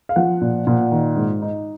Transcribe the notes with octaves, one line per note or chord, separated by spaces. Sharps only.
F5
F3 F#5
A#2
A#2
D#3
G#2
D#4